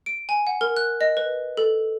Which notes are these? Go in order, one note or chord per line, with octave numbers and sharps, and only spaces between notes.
D7
G#5
F#5
A#4
F#6
D#5
B4
A4